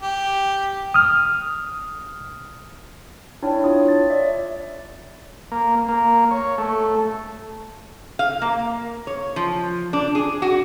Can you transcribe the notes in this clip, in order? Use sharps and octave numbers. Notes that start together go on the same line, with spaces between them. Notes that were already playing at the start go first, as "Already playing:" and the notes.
G4
D#6 F6
D4 E4 C#5 G5 A5
F4 C#5 F5 D#6
A6
C#5 D5 E5
A#3
A#3
C#5
A3
F5
A#3
C#5
F3
D4
G#4
F#4